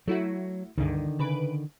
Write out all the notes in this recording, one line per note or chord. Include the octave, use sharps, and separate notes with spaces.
F#3 A3 E4 F#4
C#2 G2 D3 D#3
C#3 B4 D7